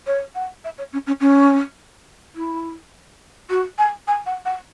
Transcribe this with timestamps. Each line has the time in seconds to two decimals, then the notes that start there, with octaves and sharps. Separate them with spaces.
0.07 C#5
0.35 F#5
0.64 E5
0.78 C#5
0.92 C#4
1.07 C#4
1.21 C#4
2.35 E4
3.50 F#4
3.78 G#5
4.07 G#5
4.26 F#5
4.45 F#5